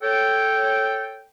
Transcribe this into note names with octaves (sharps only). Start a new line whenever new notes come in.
A4 C#5 G5